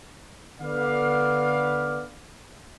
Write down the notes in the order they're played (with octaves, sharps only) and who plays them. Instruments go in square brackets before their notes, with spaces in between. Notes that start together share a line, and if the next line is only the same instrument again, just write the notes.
[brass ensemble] D3 B3 D5 F5